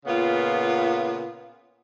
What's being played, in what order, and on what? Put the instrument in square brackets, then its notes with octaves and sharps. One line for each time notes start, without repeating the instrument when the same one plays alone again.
[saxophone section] A#2 C#3 B3 F4